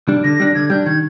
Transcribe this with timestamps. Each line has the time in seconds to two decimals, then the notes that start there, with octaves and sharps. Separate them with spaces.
0.08 G3 D4
0.24 D3 A#6
0.40 G3 D4
0.55 D3 G#6
0.70 G3 D4 G6
0.86 D#3 G#6